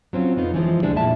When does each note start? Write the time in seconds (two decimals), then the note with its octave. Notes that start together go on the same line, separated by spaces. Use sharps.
0.13 F#3 C4 C#4 F4
0.36 F2 B3 D#4 F4
0.54 E3 F3 G#3
0.82 D2 B2 G3 G#3 D4
0.95 F2 A#2 E4 E5 A5